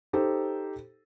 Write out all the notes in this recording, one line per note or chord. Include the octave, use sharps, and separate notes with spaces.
D#4 G4 A4 C5